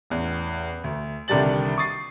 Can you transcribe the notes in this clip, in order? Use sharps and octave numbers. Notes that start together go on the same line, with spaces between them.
A1 E2
D2
C2 D3 D#3 G3 A6 F#7
C#6 D#6 A6 C7